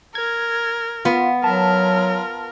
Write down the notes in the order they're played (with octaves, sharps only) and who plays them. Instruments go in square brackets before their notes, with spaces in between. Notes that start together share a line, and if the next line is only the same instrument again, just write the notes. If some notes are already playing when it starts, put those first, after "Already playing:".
[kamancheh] A#4 [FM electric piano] G#6
[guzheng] B3 [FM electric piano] F4
[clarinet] F#3 [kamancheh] F4 A#4 [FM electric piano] A5